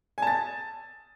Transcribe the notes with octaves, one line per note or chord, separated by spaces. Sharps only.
G#5 A5 A6